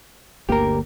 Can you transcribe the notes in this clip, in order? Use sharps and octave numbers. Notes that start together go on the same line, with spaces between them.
G1 D2 A#3 G4 A#4